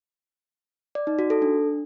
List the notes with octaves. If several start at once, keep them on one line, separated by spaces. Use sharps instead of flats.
D5
D#4
F#4
A4
D4